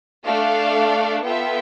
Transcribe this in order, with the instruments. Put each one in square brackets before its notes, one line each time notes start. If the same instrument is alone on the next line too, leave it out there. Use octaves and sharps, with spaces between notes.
[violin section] A3 D4 A4 D5 F5
B3 F4 A4 E5 G5